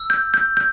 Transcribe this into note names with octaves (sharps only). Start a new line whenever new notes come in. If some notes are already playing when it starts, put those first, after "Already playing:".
Already playing: E6
G6
G6
G6